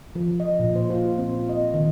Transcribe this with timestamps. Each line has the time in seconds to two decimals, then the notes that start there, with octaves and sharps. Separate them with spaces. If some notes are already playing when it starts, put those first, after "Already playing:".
0.15 F3
0.40 D#5
0.60 A#2
0.75 C5
0.90 F4
1.18 C4
1.49 D#5
1.74 D#3